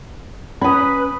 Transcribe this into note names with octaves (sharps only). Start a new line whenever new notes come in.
C#4 B4 B5 D#6